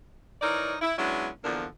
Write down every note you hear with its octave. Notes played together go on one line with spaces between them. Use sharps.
E3 D#4 A#4 C#5 D5
E4
F#3 G#3 B3 C#4 D4 E4
E2 A#2 D3 F3 D4 A#4